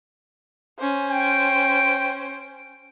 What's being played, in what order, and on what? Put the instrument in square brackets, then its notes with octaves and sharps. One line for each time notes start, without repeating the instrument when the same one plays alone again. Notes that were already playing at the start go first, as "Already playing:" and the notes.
[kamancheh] C#4 C5
[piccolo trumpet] G5